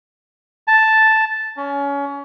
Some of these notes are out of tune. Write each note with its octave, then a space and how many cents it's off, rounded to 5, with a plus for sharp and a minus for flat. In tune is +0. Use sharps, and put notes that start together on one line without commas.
A5 +0
C#4 +25